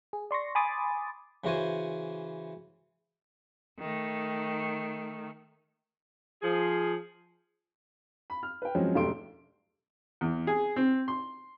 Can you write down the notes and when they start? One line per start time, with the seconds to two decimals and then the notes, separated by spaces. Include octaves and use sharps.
0.13 G#4
0.31 D5 C6 C#6 A#6
0.55 G#5 B5 C6 D6 D#6 A6
1.44 C#3 E3 F#4 C5 G#5
3.79 D#3 A3
6.43 F3 G#4
8.30 B5
8.43 F6
8.62 B4 G5
8.75 F3 F#3 G#3 C4 C#4
8.95 E1 F#2 A3 G4 C6 D7
10.21 E2
10.47 G#4
10.76 C4
11.08 C6